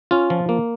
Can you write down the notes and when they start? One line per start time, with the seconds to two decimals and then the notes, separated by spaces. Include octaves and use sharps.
0.11 C#4 F4
0.30 F3
0.49 A#3